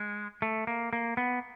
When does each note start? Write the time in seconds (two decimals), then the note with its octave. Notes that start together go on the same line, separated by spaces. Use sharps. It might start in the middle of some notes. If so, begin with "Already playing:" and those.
Already playing: G#3
0.42 A3
0.67 A#3
0.93 A#3
1.17 B3